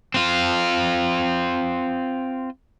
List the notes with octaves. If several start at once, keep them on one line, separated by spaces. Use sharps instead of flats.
C4 F4